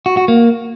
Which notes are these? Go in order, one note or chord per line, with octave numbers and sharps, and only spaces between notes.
F#4
F#4
A#3